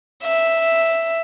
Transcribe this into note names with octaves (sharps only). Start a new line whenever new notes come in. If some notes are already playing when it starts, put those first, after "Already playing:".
E5